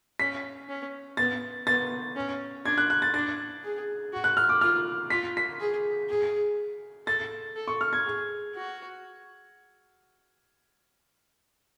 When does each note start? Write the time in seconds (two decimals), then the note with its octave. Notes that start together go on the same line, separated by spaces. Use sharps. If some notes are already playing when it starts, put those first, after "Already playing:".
0.19 C#4 B6
0.69 C#4
1.17 B3 A6
1.67 B3 A6
2.16 C#4
2.65 D4 G#6
2.78 F#6
2.90 F#6
3.02 A6
3.14 D4 A6
3.63 G#4
4.13 F#4
4.24 F#6
4.37 F6
4.49 D6
4.61 F4 F6
5.10 F4 B6
5.37 B6
5.60 G#4
6.09 G#4
7.07 A4 A6
7.56 A4
7.68 C#6
7.81 F6
7.93 G#6
8.05 G#4
8.54 F#4